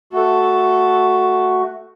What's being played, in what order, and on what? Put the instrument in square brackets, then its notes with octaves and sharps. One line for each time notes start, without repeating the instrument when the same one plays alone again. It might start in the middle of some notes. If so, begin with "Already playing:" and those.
[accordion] A3 F#4 [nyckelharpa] A4